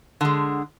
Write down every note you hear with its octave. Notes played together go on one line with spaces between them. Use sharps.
D3 G#3